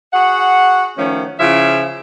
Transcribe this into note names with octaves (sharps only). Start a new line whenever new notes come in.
F#4 G#4 F#5
D#3 F3 A3 C#4
C#3 F3 E4 F4 E5